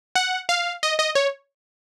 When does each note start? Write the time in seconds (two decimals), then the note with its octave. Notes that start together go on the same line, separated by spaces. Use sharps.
0.15 F#5
0.49 F5
0.83 D#5
0.99 D#5
1.15 C#5